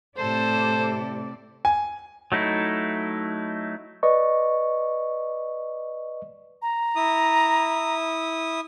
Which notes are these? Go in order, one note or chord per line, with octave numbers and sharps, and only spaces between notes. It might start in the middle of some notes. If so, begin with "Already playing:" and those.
A2 C3 A4 C5 D5
G#5
F#3 A3 D#4 E4
B4 D5 D#5 C#6
A#5
E4 D#6